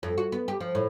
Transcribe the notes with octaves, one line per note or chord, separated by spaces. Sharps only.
F2
F#4
B3
G4
F3
A2